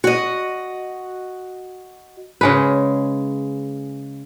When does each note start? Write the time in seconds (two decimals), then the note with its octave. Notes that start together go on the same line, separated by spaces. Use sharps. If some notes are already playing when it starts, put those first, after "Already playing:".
0.04 F#4 D#5
2.41 C#3 G#3 B4